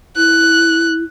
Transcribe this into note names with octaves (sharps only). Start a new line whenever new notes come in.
E4 F#6